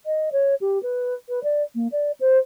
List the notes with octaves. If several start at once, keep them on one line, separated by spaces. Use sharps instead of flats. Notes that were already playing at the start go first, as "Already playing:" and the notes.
D#5
C#5
G4
B4
B4
D5
A#3
D5
C5